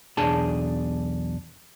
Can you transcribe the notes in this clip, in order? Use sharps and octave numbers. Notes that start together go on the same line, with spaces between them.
B1 E2 D4 G#4 A5